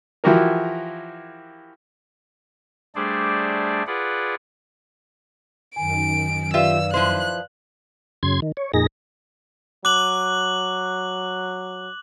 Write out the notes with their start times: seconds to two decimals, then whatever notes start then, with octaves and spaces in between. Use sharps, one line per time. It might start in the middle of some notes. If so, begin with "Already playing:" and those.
0.24 E3 F3 E4 F#4 G4 A#4
2.95 G3 A3 D4 G#4 C5 D5
3.87 F4 G#4 B4 D5 F#5
5.76 F#2 D#3 G#5 D7
6.54 F4 G4 B4 D5 E5 F5 E6
6.94 F3 E4 C5 F#6
8.23 F#2 C#3 C6 G#6
8.42 D#3
8.57 C#5
8.74 F2 A#2 D#4 G#4 A#6
9.85 F#3 D6 F#6 F#7